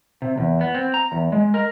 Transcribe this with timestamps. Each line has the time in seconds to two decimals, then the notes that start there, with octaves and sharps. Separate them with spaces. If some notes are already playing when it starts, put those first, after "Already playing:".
0.22 C3
0.38 E2
0.61 B3
0.75 C4
0.94 A#5
1.12 E2
1.32 G#3
1.54 A#4